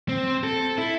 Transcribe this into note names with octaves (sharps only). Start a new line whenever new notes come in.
C4
A4
E4